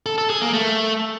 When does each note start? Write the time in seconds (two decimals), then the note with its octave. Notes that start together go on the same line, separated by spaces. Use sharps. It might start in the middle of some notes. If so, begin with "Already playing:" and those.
0.06 A4
0.18 A4
0.30 G#4
0.41 A#3
0.53 A3